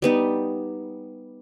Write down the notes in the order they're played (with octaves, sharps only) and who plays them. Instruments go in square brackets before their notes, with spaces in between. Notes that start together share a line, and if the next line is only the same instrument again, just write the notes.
[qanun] G3 B3 D#4